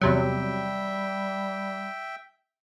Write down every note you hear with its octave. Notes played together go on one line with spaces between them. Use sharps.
E2 C3 F#3 G3 E5 G5